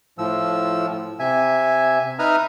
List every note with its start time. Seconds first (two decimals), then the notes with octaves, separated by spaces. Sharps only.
0.18 A2 F3 E6
1.20 C3 E5 G#5
2.19 D#4 B4 E5 A#5 D#6 F6